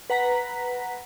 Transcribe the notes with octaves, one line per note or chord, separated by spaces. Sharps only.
B4 F#5 A#5 B6